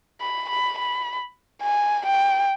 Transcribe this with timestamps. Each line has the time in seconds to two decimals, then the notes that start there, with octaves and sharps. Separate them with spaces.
0.20 B5
0.49 B5
0.78 B5
1.62 G#5
2.06 G5